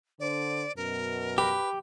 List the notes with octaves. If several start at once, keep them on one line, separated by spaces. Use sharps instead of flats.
D3 C5 D5
F#2 B2 A#4
G4 B4